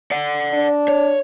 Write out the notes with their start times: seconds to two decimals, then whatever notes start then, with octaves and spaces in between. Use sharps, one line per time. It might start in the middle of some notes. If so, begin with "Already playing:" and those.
0.11 D5 F#5
0.53 D4
0.88 C#5